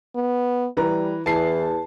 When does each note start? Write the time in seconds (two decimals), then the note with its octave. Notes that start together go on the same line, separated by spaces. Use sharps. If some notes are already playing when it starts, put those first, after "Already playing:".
0.15 B3
0.77 E3 G3 B4 A#5
1.26 E2 E3 A5 C7